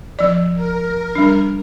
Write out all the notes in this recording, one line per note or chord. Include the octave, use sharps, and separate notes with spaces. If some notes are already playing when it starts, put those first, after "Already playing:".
F3 D5
A#4
G3 D4